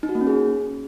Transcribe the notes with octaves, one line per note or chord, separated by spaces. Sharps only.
D#4
F#4
A#3
C#4
G#4